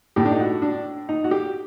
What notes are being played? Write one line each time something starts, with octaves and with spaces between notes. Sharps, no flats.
A2 G4
D4
D#4
F#4
D4
D#4
F#4
G4